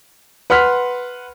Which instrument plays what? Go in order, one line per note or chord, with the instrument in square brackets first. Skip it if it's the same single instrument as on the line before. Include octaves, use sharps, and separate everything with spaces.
[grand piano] B4 F#5 C6 F6 B6